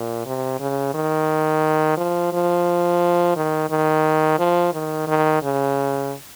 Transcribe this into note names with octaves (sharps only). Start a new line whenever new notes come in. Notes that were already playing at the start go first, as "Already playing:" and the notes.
Already playing: A#2
C3
C#3
D#3
F3
F3
D#3
D#3
F3
D#3
D#3
C#3